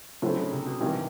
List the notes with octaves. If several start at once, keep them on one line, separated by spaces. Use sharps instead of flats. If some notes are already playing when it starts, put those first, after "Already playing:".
A2 D3 F#3 A3 C4
C#3
C3
B2
G#1 G2 C3 E3